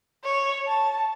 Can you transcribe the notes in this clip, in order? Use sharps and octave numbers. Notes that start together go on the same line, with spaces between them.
C#5
A5